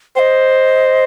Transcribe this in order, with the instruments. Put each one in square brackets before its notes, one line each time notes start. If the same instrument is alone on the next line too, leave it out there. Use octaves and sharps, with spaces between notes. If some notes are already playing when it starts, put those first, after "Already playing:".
[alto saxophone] C5 [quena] D#5 G5